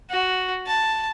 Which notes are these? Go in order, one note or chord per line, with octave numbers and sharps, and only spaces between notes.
F#4
A5